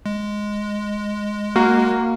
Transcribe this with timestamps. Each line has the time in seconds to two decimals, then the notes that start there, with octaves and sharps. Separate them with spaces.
0.06 G#3
1.56 A#3 F#4